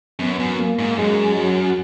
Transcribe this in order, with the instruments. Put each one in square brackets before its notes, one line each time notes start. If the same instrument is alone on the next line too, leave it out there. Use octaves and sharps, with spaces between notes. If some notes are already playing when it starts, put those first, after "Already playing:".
[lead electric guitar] F#2 [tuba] B3
[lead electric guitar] F#2
[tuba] A#3
[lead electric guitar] G#2
[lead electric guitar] F#2 [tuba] G#3
[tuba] F#3